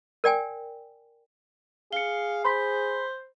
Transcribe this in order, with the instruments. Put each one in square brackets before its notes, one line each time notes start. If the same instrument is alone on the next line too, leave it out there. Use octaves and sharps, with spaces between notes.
[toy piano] A#4 D5 G5 G#5
[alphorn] G#4 [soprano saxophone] F5 [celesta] C#7 G7
[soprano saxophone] C5 [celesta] B5 C6 B6